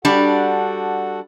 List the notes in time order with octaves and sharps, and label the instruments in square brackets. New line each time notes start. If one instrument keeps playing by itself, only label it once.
[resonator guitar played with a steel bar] G3 D4 [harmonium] F#4 A4 F#5